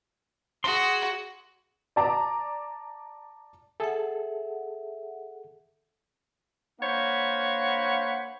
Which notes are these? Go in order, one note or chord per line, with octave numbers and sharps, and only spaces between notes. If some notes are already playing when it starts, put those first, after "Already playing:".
F#4 G#4 C6
D5 A5 A#5 D6
G#4 A4 E5 F#5
A#3 D4 C5 C#5 F#5 B5